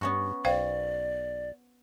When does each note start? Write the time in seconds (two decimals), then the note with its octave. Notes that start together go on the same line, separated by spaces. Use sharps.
0.01 G2 B3 C#4 F#4
0.45 B1 C5 D5 F5 G5